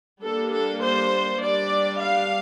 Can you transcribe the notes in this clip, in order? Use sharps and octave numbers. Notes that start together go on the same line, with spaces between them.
G3 A#3 D4 A4
A4
C5
G3 D4 D5
F5